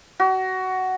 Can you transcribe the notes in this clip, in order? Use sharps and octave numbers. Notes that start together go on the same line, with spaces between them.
F#4